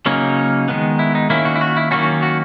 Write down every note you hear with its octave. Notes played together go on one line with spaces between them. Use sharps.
C#3 F#3 A#3 C#4 D#4
D#3 G#3 B3
E4
D#4
D#3 A#3 C#4 E4
F#4
E4
F#4
E4
D#3 F#3 A#3 C#4 F#4
F#4